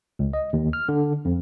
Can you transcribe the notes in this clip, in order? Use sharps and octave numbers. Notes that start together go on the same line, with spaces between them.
C#2
D#5
D#2
F6
D3
F2